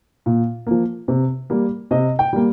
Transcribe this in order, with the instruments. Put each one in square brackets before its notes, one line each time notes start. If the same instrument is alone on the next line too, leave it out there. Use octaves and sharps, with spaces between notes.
[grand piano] A#2
F3 A#3
C3
G3 A#3
C3 D#5
G5
G3 A#3